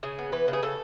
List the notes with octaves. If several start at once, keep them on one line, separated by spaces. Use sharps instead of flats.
C#3 G#4
B3
E3 B4
C#3
G#4
C#3 A4